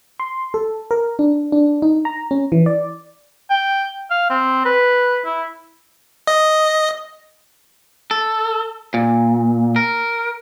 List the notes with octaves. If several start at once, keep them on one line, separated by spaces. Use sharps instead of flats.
C6
A4
A#4
D4
D4
D#4
A#5
C#4
E3
D5
G5
F5
C4
B4
E4
D#5
A4
A#2
A#4